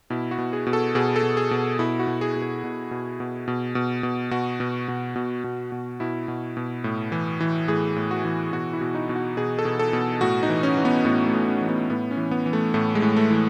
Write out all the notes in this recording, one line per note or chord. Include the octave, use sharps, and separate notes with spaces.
B2 E4
F#4
B2
G#4
B2
A4
B2 G#4
A4
B2
G#4
B2
B2 E4
F#4
B2
G#4
B2
G#4
B2
B2
B2
B2
B2
B2
B2 F#4
B2
B2
B2
B2
B2
B2 E4
B2
B2
A2
E3
E3
A2 G#4
A2
F#4
E3
B2 F#4
E4
B2
D#4
B2
F#4
B2 G#4
A4
B2
A4
B2
A2 F#4
D#4
E3
C#4
E3
B3
A2 B3
A3
A2
C#4
E3
B3
A2 B3
C#4
E3
B3
E3
A3
A2 A3
G#3
A2
A3
E3